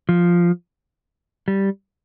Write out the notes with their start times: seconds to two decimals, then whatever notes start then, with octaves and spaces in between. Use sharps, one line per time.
0.09 F3
1.48 G3